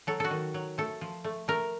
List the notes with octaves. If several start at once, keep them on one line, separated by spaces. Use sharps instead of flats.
F#3 A4
F#4 A4
D#3
F#3
A3 A4
F3
A3
A3 A#4